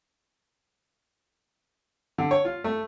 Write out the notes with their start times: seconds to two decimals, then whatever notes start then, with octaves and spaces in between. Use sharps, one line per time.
2.18 D3
2.31 C#5
2.45 F4
2.64 A3